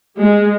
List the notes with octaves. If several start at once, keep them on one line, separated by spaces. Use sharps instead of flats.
G#3